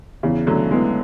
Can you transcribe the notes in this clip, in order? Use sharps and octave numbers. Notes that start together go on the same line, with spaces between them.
E2 C#3 E3
D3 F#3 A3
E3 G#3 B3